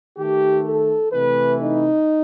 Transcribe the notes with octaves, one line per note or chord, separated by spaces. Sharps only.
D#3 A3 G4
A4
C3 E3 A3 B4
D#4